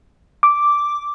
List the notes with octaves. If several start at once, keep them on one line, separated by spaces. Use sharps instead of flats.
D6